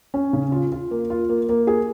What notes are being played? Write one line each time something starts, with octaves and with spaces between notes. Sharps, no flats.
C#4
C#3
F4
F4
A#3
F4
A#3
A#3
G#4